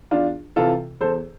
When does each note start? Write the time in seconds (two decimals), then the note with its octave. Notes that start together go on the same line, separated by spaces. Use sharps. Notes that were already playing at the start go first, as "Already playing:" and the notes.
0.11 E2 D4 F4
0.56 C3 E3 F4 A4
1.01 E2 A4 C5